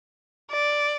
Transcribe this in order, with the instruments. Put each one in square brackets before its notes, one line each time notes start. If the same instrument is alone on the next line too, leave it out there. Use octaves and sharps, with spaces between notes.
[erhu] D5